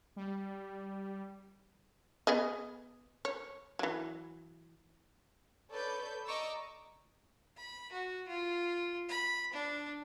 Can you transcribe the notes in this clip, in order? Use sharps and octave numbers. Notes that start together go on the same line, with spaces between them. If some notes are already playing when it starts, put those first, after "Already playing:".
G3
B3 G#4 D#5
C#5
E3 F#3
A4 B4 C#5 D5 B5 G6
D5 D#5 A#5 C#6 D6 E6
B5
F#4
F4
B5
D4